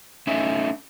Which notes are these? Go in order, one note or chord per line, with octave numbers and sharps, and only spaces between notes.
A3 C#4 D#4 E5